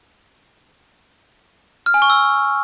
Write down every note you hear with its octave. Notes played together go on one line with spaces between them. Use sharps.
F6
G#5
C#6
E6